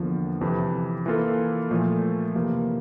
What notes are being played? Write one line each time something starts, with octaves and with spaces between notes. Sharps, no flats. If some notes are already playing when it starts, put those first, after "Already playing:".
Already playing: E2 D3 F3 A#3
F2 C3 E3
E3 A#3 F4 A4
A#2 F3 A3
F2 C3 E3 A#3 F4